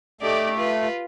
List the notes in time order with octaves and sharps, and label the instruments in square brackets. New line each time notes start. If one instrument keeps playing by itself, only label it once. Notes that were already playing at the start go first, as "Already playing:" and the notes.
[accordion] A3 [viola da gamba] D#4 G4 D5
[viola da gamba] F4 B4